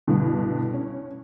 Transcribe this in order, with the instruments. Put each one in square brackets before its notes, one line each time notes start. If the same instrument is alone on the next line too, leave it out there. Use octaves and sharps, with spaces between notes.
[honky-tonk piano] C2 G2 B2 D3
C#4